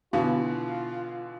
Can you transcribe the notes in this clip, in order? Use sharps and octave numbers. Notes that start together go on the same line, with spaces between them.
B2 D3 E3 B3 F4 F#4 F5